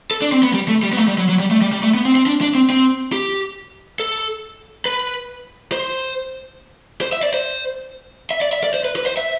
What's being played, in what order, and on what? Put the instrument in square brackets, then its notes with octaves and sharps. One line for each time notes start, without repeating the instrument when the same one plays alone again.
[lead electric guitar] A4
D4
C4
B3
G3
A3
G3
B3
A3
G3
F#3
F#3
G3
A3
G3
G3
A3
B3
C4
C4
D4
D4
C4
C4
G4
A4
B4
C5
C5
E5
D5
C5
E5
D5
E5
D5
C5
B4
B4
C5
E5